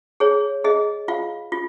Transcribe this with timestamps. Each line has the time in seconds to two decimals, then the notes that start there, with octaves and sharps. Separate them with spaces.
0.20 G#4 C#5
0.64 G#4 D#5
1.08 F4 F5
1.52 F4